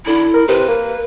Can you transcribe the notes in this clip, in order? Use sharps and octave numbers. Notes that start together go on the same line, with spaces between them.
D3 E4
A#4
C3 B4
A#3